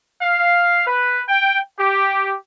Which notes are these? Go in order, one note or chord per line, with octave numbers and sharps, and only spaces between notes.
F5
B4
G5
G4